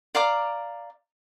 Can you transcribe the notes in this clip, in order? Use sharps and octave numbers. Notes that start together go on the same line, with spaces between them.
D5 F5 A#5 D6